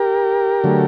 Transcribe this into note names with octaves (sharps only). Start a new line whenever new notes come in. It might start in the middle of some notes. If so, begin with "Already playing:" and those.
Already playing: G4 A#4
D3 F#3 A3